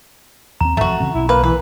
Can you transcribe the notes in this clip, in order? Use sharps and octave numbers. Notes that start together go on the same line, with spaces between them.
D#2 C4 A#5
E1 F2 F3 A3 F#4
C#3 E3 C4
B1 E4
A#3 B4
E3 B4